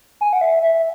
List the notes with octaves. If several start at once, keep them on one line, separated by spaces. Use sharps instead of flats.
G#5
F#5
E5
E5